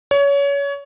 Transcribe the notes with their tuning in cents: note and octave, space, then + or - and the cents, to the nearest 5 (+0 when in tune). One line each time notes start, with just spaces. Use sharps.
C#5 +25